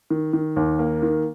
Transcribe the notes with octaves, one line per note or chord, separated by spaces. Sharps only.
D#3
D#3
D#2
A#3
D#3